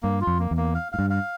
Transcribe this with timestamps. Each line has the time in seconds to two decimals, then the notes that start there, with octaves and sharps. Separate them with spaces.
0.03 G2 A#3
0.21 F4
0.27 F2
0.39 A#3
0.51 E2
0.57 A#3
0.75 F5
0.92 G#2 F5
0.99 G2
1.10 F5